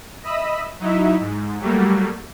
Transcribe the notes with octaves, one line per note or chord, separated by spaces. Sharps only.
D#5 E5 B5 D#6 E6
F#3 D#4 E4 E5
G#2
F#3 G3 A3 A#3